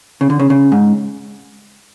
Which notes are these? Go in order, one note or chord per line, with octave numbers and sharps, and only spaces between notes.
C#3
D3
C#3
C#3
G#2